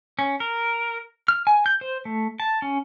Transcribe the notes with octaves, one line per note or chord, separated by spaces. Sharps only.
C#4
A#4
F6
G#5
G6
C5
A3
A5
C#4